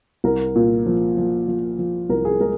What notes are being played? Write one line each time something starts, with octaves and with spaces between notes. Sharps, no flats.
C2 A#4
A#2
F3
F3
F3
F3
C2 A#4
G#4
G#3 A#4